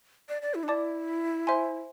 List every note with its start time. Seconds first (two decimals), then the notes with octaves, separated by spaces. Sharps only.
0.29 D5
0.42 D5
0.54 E4
0.63 D4
0.68 E4 D5 A5 D6
1.47 C5 E5 G#5 C6